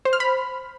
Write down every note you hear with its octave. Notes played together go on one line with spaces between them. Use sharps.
C5
F6
B5